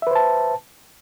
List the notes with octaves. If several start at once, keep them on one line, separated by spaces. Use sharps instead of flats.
B4 C5 E5 A5